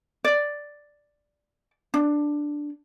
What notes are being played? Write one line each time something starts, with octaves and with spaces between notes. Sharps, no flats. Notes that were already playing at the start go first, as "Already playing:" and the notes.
D5
D4